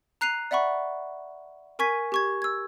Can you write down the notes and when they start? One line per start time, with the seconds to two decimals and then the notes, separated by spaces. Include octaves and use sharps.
0.21 A#5 F#6 C7 D#7 F7
0.51 D5 E5 F#5 B5 C#6
1.79 A#4 G#5 C#6 G#6 B6 D#7
2.12 G4 C#6 G#6
2.42 E6 G#6